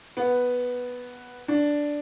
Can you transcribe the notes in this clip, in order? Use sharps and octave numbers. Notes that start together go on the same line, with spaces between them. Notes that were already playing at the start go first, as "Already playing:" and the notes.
B3
D4